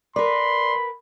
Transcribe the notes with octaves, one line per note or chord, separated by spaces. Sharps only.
A#4 B4 D5 B5 C6